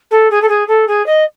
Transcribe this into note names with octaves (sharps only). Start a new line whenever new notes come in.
A4
G#4
A4
G#4
A4
G#4
D#5